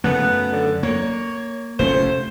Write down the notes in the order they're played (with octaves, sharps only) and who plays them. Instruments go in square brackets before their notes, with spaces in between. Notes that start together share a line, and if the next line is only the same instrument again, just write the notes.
[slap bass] F#2 C#3 A3 [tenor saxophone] B3
[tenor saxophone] D3
[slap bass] A#3 [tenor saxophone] C#5
[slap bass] F1 A3 C#4 [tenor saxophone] C5